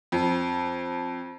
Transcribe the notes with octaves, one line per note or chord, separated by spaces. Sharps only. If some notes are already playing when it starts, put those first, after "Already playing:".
F2